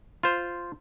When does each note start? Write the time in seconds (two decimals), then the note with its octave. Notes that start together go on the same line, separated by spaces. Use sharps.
0.23 F4 C5